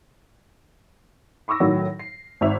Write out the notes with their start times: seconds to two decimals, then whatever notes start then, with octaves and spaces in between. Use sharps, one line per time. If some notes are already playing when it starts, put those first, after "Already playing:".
1.48 B5 C#6 D6 E6 A#6
1.60 A2 D#3 F#3
1.99 C7
2.41 G#1 E5 F7